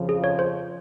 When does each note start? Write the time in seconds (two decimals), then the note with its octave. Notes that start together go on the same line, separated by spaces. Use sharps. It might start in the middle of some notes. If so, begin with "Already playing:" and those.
Already playing: F2 C#3 F3
0.09 G#4
0.24 C#5
0.39 C5